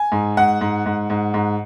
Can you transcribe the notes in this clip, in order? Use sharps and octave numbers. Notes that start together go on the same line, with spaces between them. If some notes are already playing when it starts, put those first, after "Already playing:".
Already playing: G#5
G#2
G#2 F#5
G#2
G#2
G#2
G#2